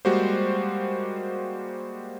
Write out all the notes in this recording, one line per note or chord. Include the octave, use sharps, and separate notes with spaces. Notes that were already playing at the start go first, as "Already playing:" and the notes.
G3 G#3 A#3 F#4 G4 C5